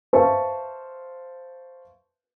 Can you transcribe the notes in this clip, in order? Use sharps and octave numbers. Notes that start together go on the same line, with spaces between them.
B4 C5 E5 F5 A5 C#6